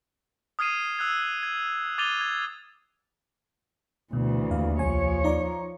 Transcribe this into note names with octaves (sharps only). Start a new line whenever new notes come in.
D#6 F6 G#6 C7 D#7 E7
E6 F#6 G#6
G#6
D6 G#6 A6 D#7 F7 G7
G#6
D2 B2 E3
D#2 F5
C2 F3 C#5 G#5
D#4 D5 A#5